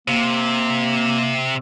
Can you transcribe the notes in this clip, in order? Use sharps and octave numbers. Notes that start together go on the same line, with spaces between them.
C3 A#3